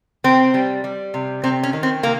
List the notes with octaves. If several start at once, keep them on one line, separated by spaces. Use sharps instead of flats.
C3 C4
G3
G3
C3
C3 C4
C#4
D#3
C4
C3 A#3